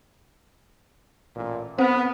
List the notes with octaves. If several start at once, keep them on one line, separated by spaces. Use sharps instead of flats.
A1 A#2
B3 C4 C5